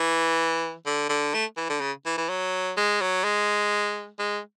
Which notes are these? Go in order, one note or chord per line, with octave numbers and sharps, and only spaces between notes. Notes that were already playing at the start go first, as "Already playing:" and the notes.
Already playing: E3
D3
D3
A3
E3
D3
C#3
E3
E3
F#3
G#3
F#3
G#3
G#3